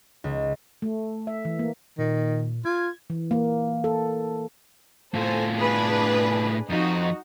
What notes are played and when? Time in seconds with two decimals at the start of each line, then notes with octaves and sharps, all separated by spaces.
0.24 C#2
0.82 A3
1.27 E5
1.45 E3
1.59 A#3
1.98 A#2 D#3
2.65 F4 G#6
3.10 E3
3.31 A#3
3.84 A4
5.14 A2 F4 A4 C5 G#5
5.56 D4 G#4 B4
6.69 F2 F3 D#4 F#4